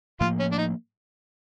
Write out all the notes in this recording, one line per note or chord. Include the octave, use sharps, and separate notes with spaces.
A2 F3 A#3 F4
C#4
D4
D#4